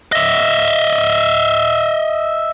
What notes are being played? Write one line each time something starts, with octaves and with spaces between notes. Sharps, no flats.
D#5 E5